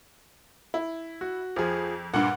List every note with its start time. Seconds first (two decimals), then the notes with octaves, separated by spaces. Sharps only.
0.74 E4
1.21 F#4
1.56 F2 F3 G#4
2.14 G2 A#2 F#5